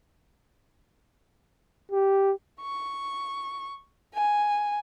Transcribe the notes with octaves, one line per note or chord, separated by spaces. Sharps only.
G4
C#6
G#5